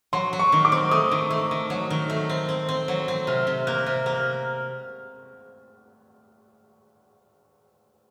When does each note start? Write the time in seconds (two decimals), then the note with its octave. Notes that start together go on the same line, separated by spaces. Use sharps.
0.13 F#3 C6
0.33 F#3
0.39 C#6
0.52 D#3
0.65 D6
0.72 C4
0.91 A3 D#6
1.12 D#3
1.31 A3
1.51 D#3
1.70 F#3
1.90 D#3
2.10 A3
2.29 C4
2.49 C4
2.69 C4
2.88 F#3
3.08 C4
3.27 C3 F6
3.47 C3
3.67 A#3 F#6
3.86 C3
4.06 A#3 F6